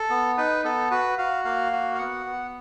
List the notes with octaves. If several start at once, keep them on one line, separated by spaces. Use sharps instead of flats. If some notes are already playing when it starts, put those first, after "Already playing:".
Already playing: A4
B3
D#4 B4
B3 A4
F#4 B4
F#4 F5
A#3 F5
F#4
F5
B3 F#5
B3